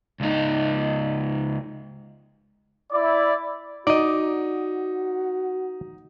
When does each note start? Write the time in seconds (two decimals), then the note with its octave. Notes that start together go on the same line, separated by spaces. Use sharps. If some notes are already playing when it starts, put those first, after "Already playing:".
0.20 C#2 D#4
2.92 E4 D5
3.87 D#4 F#4 D5 D#5